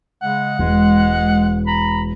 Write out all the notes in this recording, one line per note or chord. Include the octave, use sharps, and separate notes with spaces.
C#3 G#3 F#5
E1 G#3
A#5 B5